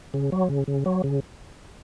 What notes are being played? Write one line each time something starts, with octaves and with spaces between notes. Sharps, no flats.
C#3
F#3
C#3
C#3
F#3
C#3